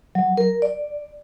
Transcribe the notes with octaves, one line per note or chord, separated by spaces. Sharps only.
F#3
A#4
D5